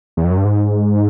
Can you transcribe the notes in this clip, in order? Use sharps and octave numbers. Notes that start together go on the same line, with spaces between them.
E2
F2
F#2
G2
G#2